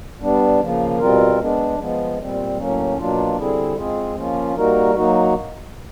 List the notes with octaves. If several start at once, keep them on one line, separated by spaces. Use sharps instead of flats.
G3 B3 D4
C#3 F3 A#3
B2 G3 C4 F4 A#4
G#3 B3 D4
F3 G#3 B3
A#2 G3 C4
A2 F#3 A#3 C#4
B2 F#3 A#3 D4 F4
D3 G3 C4 E4 G#4
G#3 C4 F4 G#4
F3 A#3 C#4 F4
G3 A#3 D#4 F#4 A#4
F#3 A#3 D#4 F#4